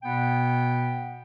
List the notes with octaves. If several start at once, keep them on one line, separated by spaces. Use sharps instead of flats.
B2 B3 G5